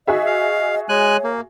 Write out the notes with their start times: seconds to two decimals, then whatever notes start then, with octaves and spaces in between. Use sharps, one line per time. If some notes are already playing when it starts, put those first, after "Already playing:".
0.07 F#4 G#4 D#5 E5
0.27 F5
0.89 G#3 C#5 G#5 F#6
1.24 A#3